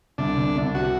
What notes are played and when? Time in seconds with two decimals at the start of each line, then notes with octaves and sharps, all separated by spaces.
0.18 C2 D4
0.38 C2
0.56 C2
0.75 C3 F#4